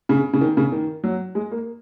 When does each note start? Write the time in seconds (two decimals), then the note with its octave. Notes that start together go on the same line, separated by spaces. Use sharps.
0.09 C#3
0.33 C#3
0.41 D#3
0.57 C#3
0.72 D#3
1.04 F#3
1.35 G#3
1.51 A#3